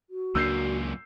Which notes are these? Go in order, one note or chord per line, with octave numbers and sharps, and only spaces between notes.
F#4
C#2 F#2 A#2 A#3 D4 E6 G6 C7